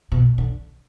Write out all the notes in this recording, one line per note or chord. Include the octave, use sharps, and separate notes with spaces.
B2
D3